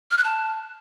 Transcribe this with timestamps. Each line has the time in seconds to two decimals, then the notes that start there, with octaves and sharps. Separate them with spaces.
0.11 F6
0.18 F#6
0.24 A5